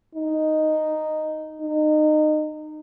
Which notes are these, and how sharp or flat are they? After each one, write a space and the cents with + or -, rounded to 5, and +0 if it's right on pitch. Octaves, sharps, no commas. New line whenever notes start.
D#4 -5
D#4 -25